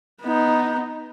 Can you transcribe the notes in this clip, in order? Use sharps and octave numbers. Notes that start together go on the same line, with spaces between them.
B3 D#4